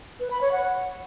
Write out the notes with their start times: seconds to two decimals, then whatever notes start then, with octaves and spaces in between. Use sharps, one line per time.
0.20 B4
0.31 B5
0.41 C#5
0.52 F#5